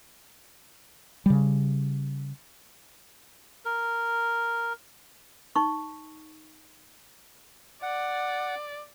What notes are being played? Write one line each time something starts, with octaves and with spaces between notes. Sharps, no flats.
C#3 G3
A#4
D#4 C#6
D5 F#5